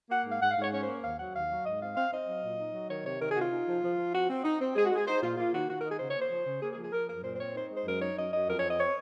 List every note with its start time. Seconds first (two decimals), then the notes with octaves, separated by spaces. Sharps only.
0.10 A#3 F#5
0.25 G#2 F5
0.41 G#2 F#5
0.51 F5
0.57 G#2 C#5
0.71 C#4 C#5
0.82 C5
0.87 A#3
1.02 D#2 F5
1.18 F#3 F#5
1.34 D#2 F5
1.49 F#3
1.65 G#2 D#5
1.81 C4 F5
1.96 C4 F5
2.11 C4 D#5
2.27 F#3
2.42 A#2
2.58 D#4
2.73 F#3
2.89 D#3 C#5
3.05 C3 C#5
3.20 D#3 A#4
3.30 G#4
3.35 C3 F#4
3.41 F4
3.51 D#4
3.67 F3
3.82 F3
3.97 F3
4.13 C4 F#4
4.29 C4
4.44 D#4
4.60 C4
4.75 G#3 G#4
4.85 F#4
4.91 G#3 G#4
5.07 D#4 C5
5.21 A#2 F4
5.37 A#3 F4
5.53 D#3 F#4
5.69 D#3 F#4
5.79 D#4 A#4
5.89 G#4
5.99 C#3 C5
6.09 C#5
6.15 A#3 C5
6.30 F3
6.45 C#3
6.61 A#3 G#4
6.72 G#4
6.77 F3
6.83 G#4
6.92 F3 A#4
7.08 F#2 A#4
7.23 A#2 C5
7.33 C5
7.39 C4 C#5
7.54 D#4 C5
7.70 G#3
7.76 C5
7.85 F#2 A#4
8.01 D#4 C#5
8.16 F#2 D#5
8.32 F#2 D#5
8.47 F2 A#4
8.58 C#5
8.63 C4
8.68 D#5
8.78 C4 C#5